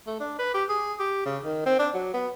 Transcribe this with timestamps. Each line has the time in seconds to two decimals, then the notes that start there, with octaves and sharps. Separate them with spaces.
0.07 A3
0.20 D4
0.39 B4
0.54 G4
0.69 G#4
1.00 G4
1.25 C#3
1.44 D#3
1.66 C4
1.79 D4
1.94 F#3
2.13 B3